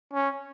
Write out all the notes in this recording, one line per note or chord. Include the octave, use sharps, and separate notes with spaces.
C#4